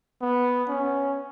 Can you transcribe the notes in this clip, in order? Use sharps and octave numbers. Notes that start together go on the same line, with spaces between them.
B3
C#4